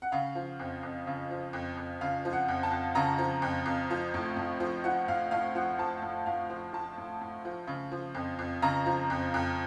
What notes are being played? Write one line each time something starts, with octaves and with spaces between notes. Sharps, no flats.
F#5
C#3 F5
F3
F2
F2
C#3
F3
F2
F2
C#3 F5
F3
F#5
F2
A5
F2
C#3 A#5
F3
F2
F2
F3
A2
A2
F3
F3 F#5
A2 F5
A2 F5
F3 F#5
F3 A5
A2
A2 F5
F3
F3 A5
A2
A2
F3
C#3
F3
F2
F2
C#3 A#5
F3
F2
F2